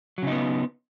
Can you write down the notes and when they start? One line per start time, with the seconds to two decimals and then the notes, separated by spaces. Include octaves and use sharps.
0.18 F#3
0.22 C#3
0.27 D#4
0.32 B3